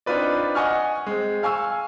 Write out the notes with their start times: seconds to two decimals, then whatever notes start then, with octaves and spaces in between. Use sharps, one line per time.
0.06 C4 D4 D#4 F4 B4 D5
0.55 D#5 F#5 G#5 C#6 F6
1.07 G#3 C4
1.43 F5 G#5 C#6 E6